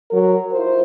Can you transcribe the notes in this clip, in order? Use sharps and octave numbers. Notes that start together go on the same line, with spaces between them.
F#3 A#4
E4 F4 A#4 C5